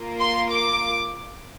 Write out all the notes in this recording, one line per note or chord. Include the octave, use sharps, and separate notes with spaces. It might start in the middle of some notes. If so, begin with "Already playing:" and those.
Already playing: A#3 F4
C6
D6